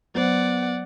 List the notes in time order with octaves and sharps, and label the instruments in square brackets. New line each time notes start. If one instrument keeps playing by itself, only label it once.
[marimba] F#3 C5 [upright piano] B3 [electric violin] D5 F#5